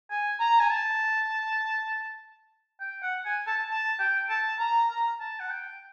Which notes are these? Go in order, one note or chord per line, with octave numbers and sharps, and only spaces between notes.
G#5
A#5
G#5
A5
G5
F#5
G#5
A5
A5
G5
A5
A#5
A#5
A5
F#5
G5